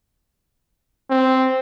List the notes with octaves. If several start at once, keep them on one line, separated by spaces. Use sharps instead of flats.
C4